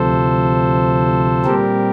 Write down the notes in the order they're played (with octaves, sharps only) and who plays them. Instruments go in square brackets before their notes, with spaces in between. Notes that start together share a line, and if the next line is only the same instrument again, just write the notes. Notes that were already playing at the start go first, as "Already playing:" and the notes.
Already playing: [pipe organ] D2 C3 F3 A4 C5
A#2 G3 C4 G4 A#4